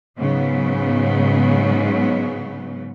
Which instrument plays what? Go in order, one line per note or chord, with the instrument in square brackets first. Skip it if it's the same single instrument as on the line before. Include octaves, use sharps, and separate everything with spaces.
[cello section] G#2 C#3 F#3 B3